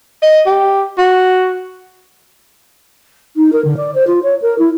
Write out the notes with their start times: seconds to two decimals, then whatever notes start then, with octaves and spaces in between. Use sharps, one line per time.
0.23 D#5
0.46 G4
0.98 F#4
3.36 D#4
3.53 A#4
3.65 D3
3.77 D5
3.95 C5
4.07 F4
4.23 C#5
4.42 A#4
4.59 E4